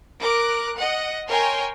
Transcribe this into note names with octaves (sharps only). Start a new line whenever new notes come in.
A#4 D6 F#6
D#5 F#5
A#4 C#5 G5 G#5 A#5 C6